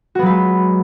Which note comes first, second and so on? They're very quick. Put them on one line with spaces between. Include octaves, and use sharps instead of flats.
F#4 B3 F#3 B4 G#3